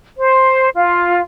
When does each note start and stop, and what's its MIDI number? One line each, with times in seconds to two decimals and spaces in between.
0.17 0.68 72
0.76 1.20 65